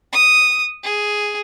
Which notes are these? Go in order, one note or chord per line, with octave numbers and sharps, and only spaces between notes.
D#6
G#4